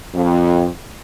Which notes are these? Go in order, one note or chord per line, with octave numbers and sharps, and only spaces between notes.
F2